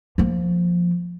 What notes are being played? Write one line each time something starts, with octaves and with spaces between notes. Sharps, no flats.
F3 A#3